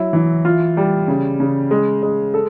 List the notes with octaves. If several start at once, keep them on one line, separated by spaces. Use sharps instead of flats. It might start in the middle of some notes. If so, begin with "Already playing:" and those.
Already playing: F#3 E4
E3
F4
G3
C#3
C#3
G#3
G#3
A4